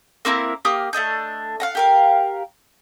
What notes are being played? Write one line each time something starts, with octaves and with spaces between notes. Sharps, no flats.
A#3 C4 E4 A#4
A#3 G4 D#6 F6
A3 D4 D#5 G6
F5 F#5 A#5
G4 A#4 F5